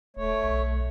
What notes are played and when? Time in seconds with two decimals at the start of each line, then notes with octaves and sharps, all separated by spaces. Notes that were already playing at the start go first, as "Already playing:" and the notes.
0.17 D#1 A3 C#5
0.43 B1